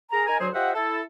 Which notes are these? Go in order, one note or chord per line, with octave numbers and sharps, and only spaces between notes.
G#4 A#4 A#5
D#4 A#4 G#5 A#5
D2 F#3 G#4 C5
F4 G4 C5 D#5 E5 F#5
E4 A4